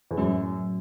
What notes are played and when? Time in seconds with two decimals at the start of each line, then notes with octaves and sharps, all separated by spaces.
0.11 E2
0.17 F#2 A2 F#3 C#4 F#4